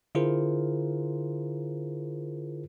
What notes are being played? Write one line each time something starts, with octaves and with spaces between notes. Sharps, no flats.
D3 E4 F4 G#4 A#4 C5